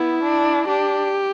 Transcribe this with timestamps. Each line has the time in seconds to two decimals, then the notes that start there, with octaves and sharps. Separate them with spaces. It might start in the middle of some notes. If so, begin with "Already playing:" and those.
Already playing: B3 E4
0.23 D4
0.68 D4 G4